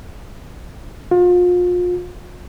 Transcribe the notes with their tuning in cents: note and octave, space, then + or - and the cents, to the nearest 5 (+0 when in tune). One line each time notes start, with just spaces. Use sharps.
F4 +35